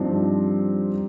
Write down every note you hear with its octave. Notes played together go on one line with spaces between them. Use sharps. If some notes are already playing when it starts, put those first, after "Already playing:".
Already playing: G2 F3 C4 D#4